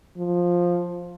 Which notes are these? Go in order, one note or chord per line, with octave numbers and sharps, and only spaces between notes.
F3